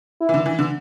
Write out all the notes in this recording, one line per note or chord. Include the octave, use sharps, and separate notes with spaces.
E4
E3
D3
E3
D3